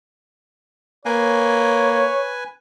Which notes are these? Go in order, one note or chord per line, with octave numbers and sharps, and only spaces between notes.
A#3 B4 C#5 G#5